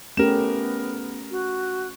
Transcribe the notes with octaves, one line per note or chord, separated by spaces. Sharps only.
A3 B3 C#4 G4 A#4 E7
F#4